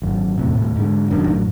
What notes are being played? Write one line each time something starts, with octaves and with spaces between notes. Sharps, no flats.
G#1 F#2
E2 A2 C3
D#1 A2
G#2 D3 G#3
F1 F#2 D#3 D4
A1 F#2 A2